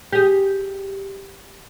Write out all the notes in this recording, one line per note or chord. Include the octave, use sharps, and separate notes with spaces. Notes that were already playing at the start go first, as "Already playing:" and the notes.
G4 G#4